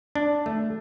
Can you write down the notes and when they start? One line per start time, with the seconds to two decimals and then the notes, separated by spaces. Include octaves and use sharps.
0.15 D4
0.46 A3